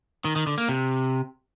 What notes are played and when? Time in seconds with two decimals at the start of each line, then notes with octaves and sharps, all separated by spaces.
0.25 D#3
0.36 D#3
0.47 D3
0.58 A#3
0.69 C3